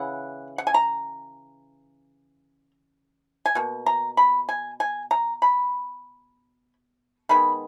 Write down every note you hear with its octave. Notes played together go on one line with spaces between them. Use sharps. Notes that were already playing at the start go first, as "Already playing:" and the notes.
Already playing: C#3 E3 F#5
F#5
G#5
A#5
G#5
B2 A#3
A#5
B5
G#5
G#5
A#5
B5
D#3 G#3 B3 B5